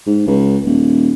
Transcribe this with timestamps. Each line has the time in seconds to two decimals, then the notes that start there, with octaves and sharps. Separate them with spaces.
0.07 G#2
0.27 C#2
0.65 D#1